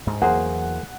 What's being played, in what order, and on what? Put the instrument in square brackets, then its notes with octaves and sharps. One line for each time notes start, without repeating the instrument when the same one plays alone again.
[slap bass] D2 G#2
[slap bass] E2 E3 F#3 [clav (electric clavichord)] A#3 G#4 C5 [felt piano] F#5